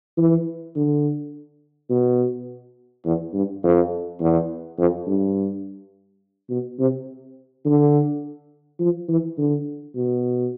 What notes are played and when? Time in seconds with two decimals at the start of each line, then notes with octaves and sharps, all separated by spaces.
0.18 E3
0.76 D3
1.90 B2
3.05 E2
3.34 G2
3.63 F2
4.20 E2
4.78 F2
5.07 G2
6.50 B2
6.79 C3
7.65 D3
8.80 F3
9.09 E3
9.38 D3
9.96 B2